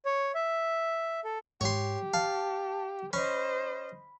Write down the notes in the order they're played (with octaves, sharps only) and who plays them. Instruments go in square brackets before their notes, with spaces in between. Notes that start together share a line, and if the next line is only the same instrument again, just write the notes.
[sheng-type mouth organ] C#5
E5
A4
[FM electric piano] G#2 [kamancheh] G4 [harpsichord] C#5 C6
[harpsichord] F5 [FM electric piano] A5
[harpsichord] C#4 [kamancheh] C5 D#5 [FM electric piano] B5